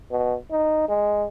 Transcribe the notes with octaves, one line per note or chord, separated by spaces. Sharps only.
B2
D#4
G#3